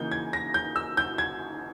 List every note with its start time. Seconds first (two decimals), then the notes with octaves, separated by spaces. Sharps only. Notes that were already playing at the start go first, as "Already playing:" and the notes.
Already playing: C#3 E3 A#3 D#4 G6
0.11 G#6
0.33 A#6
0.54 G6
0.76 E6
0.97 G6
1.18 G#6